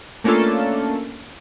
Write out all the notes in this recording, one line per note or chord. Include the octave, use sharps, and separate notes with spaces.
A3 A#3 C#4 D4 F4 A4